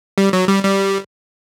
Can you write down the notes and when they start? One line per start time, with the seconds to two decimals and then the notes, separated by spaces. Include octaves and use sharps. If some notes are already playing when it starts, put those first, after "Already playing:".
0.18 G3
0.33 F#3
0.48 G3
0.64 G3